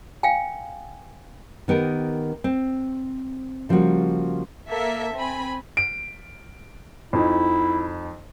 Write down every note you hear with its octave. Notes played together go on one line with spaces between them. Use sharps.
F5 G5 G#5
D#3 B3 G4 A#4
C4
C#3 F3 G3 A#3 F#4
A#3 A4 E5
C4 G#5 B5
D7
F2 D#4 E4